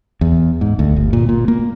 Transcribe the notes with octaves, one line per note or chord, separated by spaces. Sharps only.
E2
G#2
D2
G1
A#2
A#2
A#3